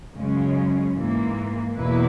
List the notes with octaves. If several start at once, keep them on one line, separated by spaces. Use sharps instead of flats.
F#2 C#3 G#3 C#4
G#2 E3 A#3
E2 B2 A#3 E4 B4